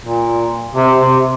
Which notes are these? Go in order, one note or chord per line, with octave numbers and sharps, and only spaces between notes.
A#2
C3
C3